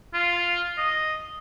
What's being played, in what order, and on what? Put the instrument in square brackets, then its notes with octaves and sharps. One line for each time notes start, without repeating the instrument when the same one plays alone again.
[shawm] F4
D#5